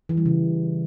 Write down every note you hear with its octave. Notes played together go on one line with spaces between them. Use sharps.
E3
G3
C#3